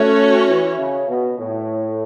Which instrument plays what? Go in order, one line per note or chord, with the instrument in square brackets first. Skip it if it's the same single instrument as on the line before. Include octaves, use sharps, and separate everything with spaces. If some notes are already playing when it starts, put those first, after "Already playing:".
Already playing: [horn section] A3 [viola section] C#4 F#4 C#5
[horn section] E3
C#3
B2
A2